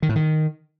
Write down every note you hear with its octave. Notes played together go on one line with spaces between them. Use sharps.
D#3
A2
D#3